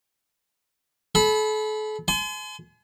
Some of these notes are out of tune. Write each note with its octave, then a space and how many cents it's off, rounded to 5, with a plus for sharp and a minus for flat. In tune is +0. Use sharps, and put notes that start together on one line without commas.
A4 -40 B5 +0
G#5 +40 C6 -35